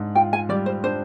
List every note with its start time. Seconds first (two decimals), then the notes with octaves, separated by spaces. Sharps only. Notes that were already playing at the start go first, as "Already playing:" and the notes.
Already playing: G#2 D4
0.15 F4 G5
0.33 G#5
0.49 G3 D5
0.66 C5
0.84 D4 C5